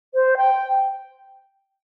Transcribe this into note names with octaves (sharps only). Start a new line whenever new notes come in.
C5
G5